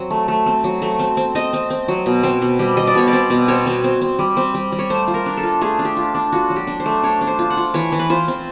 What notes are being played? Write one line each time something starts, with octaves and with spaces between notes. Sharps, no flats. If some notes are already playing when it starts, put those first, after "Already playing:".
Already playing: F#3 C4
A3
A3
C4
F#3
A3
C4
C4
C4 D#5
C4
C4
F#3
B2
C4
B2
G3
G3 D#5
D5
B2 C#5
D5
C4
B2
C4 C#5
C4
C4
C4
G3
C4
G3
G3
C#5
A3 C5
F4
A#4
D4
A4
F4
A3 G#4
D4
G4
F4
D4
F4 F#4
F#3
G4
D4
C5
A3
D4 C#5
D4
C5
F4
F#5
F4
E3 C#5
E3
B4
F4 C5
C4